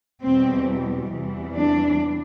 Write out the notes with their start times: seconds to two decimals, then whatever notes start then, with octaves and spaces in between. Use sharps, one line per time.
0.22 E2 B2 G3 C4
1.11 E2 C3 E3 G3
1.56 D4